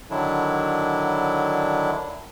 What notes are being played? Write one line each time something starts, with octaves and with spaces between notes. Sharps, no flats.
D3 D#3 F#3 D4 E4